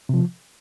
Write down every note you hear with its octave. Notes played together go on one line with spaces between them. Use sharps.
C3 F3